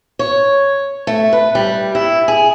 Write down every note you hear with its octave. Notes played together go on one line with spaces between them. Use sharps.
C#5
A3
B4
G3
E4
G#4